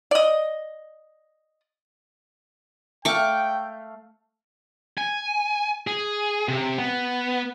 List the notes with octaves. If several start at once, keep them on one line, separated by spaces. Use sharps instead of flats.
D5 D#5
A3 F5 G5 C#6 D6
G#5
G#4
C3
B3